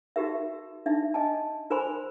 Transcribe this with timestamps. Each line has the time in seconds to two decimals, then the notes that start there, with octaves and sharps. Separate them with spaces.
0.16 D#4 F#4 G4 A#4 E5
0.86 D4 D#4 E5
1.14 D#5 G#5 A5
1.70 F4 A#4 C5 G#5 B5 C6